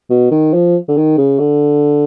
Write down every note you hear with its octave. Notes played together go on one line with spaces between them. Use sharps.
B2
D#3
F3
D3
D#3
C#3
D3